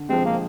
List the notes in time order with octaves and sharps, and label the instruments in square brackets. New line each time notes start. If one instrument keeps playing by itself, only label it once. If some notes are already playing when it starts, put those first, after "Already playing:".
Already playing: [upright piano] D3
[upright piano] F3 G#3 [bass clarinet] C4
[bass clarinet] A#3